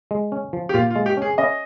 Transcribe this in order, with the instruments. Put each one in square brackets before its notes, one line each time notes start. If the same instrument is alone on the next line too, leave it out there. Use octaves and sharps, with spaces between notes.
[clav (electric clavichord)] G#3
C#4
F3
[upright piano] G4
[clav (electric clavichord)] A#2 [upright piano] F4
[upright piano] F4
[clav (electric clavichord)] G#3
[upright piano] G4
[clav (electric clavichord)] C#4 [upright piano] G#4
[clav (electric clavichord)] C#4 [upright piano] D#5